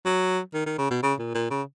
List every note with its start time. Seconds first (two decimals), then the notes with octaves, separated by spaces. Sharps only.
0.05 F#3
0.54 D#3
0.66 D#3
0.78 C#3
0.90 B2
1.03 C#3
1.19 A#2
1.35 A#2
1.51 C#3